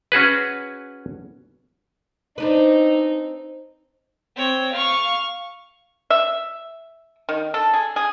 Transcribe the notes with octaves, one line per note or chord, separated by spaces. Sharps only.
C#4 F#4 G#4 B4
C4 D4 D#4 B4
C4 C#5
F5 C#6
E5
D#3
A4
G#4
G#4